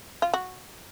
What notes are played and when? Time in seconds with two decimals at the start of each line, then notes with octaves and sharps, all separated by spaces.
0.22 F4
0.34 F#4